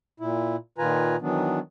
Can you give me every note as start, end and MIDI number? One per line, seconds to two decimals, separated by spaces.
0.20 0.56 46
0.20 0.56 64
0.78 1.16 46
0.78 1.16 51
0.78 1.16 65
0.78 1.16 71
0.78 1.16 80
0.78 1.16 82
1.22 1.59 51
1.22 1.59 52
1.22 1.59 54
1.22 1.59 59
1.22 1.59 62